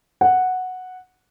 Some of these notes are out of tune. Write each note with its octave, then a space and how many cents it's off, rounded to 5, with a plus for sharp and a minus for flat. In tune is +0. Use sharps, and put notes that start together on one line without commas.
F#5 -5